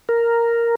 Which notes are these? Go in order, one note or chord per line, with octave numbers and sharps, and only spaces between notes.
A#4